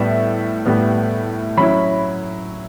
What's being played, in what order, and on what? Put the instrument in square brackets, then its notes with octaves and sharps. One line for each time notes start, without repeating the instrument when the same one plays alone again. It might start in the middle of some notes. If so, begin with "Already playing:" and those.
Already playing: [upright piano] A2 G3 B3 E5
A2 G3 B3
F#3 C#4 E4 B5